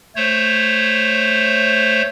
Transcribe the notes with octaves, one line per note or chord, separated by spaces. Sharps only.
A3 C5 C#5